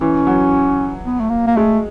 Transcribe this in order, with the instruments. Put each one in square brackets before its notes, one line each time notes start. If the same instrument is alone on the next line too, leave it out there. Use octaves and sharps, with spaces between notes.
[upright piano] E3 [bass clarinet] C#4
[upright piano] F#3
[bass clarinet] B3
A3
A#3
A#3
[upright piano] G#3 [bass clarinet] A3